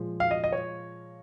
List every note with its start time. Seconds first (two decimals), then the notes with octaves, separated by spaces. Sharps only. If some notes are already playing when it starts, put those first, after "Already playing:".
Already playing: A#2 F3 G#3
0.20 F5
0.31 D#5
0.44 D#5
0.52 C#5